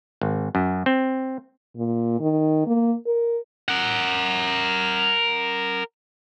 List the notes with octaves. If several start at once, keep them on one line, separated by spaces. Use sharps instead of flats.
G#1
F#2
C4
A#2
D#3
A#3
A#4
A#4 F#5